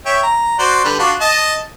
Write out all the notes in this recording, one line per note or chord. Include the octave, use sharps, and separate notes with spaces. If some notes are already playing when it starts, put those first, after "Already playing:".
C#5 E5 G5
A#5
F#4 C5 D5
D3 G3 B4
D4 F4 F#4
D#5 A5